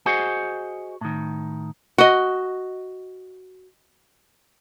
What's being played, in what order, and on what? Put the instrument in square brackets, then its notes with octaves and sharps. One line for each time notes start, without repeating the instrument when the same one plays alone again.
[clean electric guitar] F#4 G#4 C5 D#5 F#5 G#5
A2 D#3
[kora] F#4 D#5